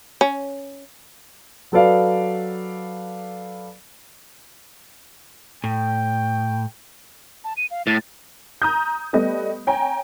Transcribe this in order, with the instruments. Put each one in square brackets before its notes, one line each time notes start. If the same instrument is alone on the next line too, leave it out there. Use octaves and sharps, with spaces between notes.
[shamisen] C#4
[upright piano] F#3 A4 B4 D5 F5
[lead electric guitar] A2 [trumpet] G5
[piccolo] A5
D#7
F5
[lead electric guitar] A2 [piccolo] A6
[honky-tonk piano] A#5 D#6 G6
G3 A3 B3 D#5
C#5 G5 G#5 A#5